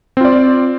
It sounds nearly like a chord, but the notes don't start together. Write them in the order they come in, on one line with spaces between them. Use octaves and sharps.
C4 F4 D5